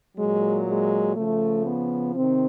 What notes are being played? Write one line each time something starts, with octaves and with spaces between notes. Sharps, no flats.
A#2 F#3 G#3
G#3
C#3 F3 A3
B3
C3 D#3 C4